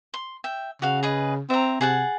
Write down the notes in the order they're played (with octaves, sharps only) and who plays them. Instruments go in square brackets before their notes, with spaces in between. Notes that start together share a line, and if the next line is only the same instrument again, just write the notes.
[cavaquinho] C6
E5 G5
[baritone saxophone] C#3 [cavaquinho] F#4 F5
[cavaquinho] G#4 B4 D#5
[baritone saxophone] C4 [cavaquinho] E5 A#5
[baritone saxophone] C3 [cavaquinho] G#4 F#5 A5